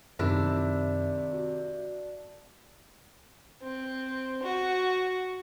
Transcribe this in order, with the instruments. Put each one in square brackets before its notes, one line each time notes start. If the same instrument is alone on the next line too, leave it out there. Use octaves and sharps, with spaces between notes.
[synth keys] F#2 [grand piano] C3 D#3 [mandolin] D4 E4
[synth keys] F#4
[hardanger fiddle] C4
F#4